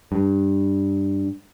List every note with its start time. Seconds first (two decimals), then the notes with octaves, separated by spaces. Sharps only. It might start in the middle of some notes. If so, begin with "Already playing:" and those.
0.12 G2